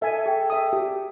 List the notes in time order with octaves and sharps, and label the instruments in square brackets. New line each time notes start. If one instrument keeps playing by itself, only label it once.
[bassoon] A4 [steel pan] E5 G#5
[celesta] G#4 G5
[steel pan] E5 D#6
G4